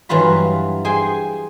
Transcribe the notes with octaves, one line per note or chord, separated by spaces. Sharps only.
G2 E3 F#3 F4 B5
G#4 C5 G5 G#5